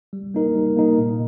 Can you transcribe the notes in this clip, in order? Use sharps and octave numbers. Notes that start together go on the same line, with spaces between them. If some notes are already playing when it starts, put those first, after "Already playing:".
G3
A#3 D#4 A#4
G3
A#3 D#4 A#4
A#2